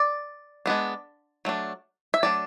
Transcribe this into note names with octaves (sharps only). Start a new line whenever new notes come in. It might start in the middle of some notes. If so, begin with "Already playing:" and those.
Already playing: D5
G#3 B3 D4
F#3 A3 D4
E5
F#3 A3 D4 D5